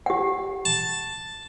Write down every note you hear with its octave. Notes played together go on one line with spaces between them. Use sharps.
G4 F#5
A5